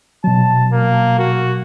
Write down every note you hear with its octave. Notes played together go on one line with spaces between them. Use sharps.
B2 F#3 A5
A#3
F#4